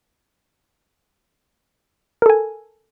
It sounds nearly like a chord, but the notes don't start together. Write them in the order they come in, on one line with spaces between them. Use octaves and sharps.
A#4 A4 G#5